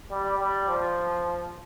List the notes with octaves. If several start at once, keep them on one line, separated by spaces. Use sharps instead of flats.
G3
G3
F3